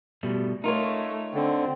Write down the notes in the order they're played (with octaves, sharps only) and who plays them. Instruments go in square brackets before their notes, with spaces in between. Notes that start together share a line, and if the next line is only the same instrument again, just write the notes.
[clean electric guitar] B2 G3 A3
[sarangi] A3 [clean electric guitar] D#4 F4 [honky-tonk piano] A#4 C#5
[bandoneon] D3 [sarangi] C4